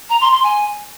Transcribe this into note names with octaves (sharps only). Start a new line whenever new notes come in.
A#5
C6
C6
G#5